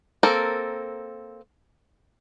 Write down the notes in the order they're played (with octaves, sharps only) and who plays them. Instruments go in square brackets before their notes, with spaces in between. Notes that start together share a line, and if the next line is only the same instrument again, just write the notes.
[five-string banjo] A#3 C4 A4 A#4